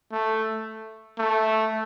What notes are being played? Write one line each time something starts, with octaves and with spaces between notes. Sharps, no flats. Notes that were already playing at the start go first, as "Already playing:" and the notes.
A3
A3